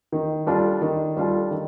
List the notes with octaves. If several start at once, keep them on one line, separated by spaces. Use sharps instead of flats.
D#3
G3 D4 F4 A4
D#3
G3 D4 F4 A4
D#3